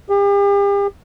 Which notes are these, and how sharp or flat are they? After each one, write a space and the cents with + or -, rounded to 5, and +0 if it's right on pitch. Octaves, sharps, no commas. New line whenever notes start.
G4 +40